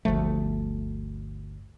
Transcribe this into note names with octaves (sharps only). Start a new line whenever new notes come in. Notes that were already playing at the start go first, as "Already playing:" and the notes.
G1 D2 F3 A3